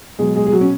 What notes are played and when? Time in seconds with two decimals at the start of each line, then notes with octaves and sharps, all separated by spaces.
0.19 B2 F#3 G#3 G#4
0.36 G#3 G#4
0.47 G#4
0.52 F#3 F#4
0.61 C#4